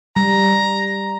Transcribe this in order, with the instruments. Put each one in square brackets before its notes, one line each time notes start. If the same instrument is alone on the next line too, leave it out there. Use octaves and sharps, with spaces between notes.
[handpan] G3 [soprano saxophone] A#5